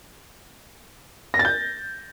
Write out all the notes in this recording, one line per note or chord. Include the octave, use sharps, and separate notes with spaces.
A#6
A6
G6